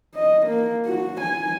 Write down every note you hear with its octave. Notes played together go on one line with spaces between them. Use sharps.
D#5
A#3
F#4
G#5